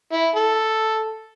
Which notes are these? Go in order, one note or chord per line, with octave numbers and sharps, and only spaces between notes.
E4
A4